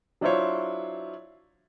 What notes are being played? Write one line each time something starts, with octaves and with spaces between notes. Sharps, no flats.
F#3 D4 E4 F4 C5 C#5